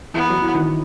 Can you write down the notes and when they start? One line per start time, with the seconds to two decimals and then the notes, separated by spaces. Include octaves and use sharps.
0.14 E3 B3
0.28 F#3
0.42 E3
0.55 D#3